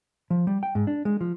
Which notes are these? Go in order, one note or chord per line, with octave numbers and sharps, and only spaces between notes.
F3
G3
G5
G#2
D4
G#3
F3